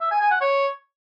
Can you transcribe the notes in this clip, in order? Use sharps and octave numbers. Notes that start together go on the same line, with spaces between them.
E5
G#5
G#5
F#5
C#5